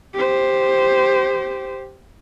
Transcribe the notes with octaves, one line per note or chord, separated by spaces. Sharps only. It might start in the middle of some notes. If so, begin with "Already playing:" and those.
G4 C5